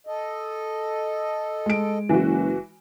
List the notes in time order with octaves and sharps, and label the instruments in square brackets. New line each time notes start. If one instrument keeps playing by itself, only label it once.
[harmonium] A4 D#5
[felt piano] G#3 D7
[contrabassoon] F#1 [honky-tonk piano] E3 F#4